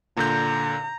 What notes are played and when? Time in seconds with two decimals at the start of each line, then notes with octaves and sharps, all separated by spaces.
0.17 A#2 D3 A#5 G6